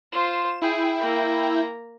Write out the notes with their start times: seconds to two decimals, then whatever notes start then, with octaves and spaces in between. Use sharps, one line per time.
0.12 F4 C5 E7
0.62 E4 G#4 G5
0.99 A#3 A#5